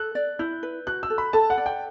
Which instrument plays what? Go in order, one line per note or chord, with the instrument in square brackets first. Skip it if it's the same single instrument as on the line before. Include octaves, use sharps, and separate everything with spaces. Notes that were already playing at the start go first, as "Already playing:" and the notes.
Already playing: [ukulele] A4 [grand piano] F#6
[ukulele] D5
[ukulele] E4 [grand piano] G6
[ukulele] B4
[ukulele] F#4 [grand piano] F#6
[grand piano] E6
[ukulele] A4
[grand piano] B5
[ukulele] A4 [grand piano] A5
[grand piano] F#5
[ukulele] D5
[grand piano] G5